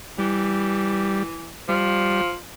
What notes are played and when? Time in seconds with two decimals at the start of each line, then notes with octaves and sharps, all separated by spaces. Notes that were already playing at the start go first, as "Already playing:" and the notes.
0.18 E3 G3
1.68 F3 G3